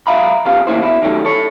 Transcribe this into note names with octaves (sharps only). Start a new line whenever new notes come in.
C#2 F#3 E5 F5 A#5 B5
C#3 F3 B3 C#4 G4 F5
A2 E3 A#3 C#4 E4 C5
B2 E4
D#3 F#3 G3 A3 C#4
A4 C#5